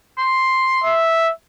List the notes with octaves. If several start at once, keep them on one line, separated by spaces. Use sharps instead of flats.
C6
E5